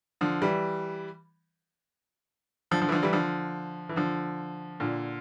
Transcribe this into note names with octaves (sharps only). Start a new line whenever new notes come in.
D3 F3
E3 G3
D3 F3
D3 F3
E3
D3 F3
E3 G3
D3 F3
E3
D3 F3
A#2 D3